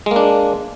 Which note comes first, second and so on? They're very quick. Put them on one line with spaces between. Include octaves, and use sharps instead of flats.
G#3 A#3 D4